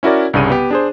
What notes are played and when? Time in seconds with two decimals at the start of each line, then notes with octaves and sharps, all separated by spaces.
0.03 C#4 E4 F#4 A#4 D5
0.34 C2 G2 C#3 D#7
0.50 B3 G4
0.71 D4 G#4 C5